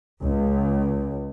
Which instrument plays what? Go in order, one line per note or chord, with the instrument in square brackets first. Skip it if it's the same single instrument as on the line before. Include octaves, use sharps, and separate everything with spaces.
[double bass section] C#2